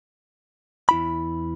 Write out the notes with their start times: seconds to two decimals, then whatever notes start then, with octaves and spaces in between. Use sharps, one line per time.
0.89 E2 E4 B5